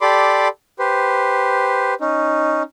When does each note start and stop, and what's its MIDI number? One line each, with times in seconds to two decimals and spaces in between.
0.01 0.48 67
0.01 0.48 69
0.01 0.48 74
0.01 0.48 83
0.01 0.48 84
0.01 0.48 86
0.79 1.94 67
0.79 1.94 71
0.79 1.94 72
2.01 2.63 61
2.01 2.63 63